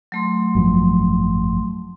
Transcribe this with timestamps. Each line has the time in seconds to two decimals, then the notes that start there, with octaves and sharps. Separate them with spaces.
0.12 F#3 A3 C6
0.55 G#1 F#2 F3